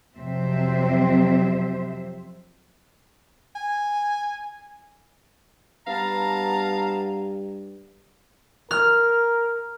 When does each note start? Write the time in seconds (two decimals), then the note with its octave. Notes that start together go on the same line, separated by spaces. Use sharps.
0.17 F2 C3 F#3 C4 C5 E5
3.55 G#5
5.87 G2 B3 F5 A5 A#5
8.71 A#4 F6